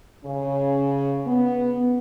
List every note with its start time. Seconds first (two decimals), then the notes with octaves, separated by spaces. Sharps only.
0.25 C#3 C#4
1.26 B3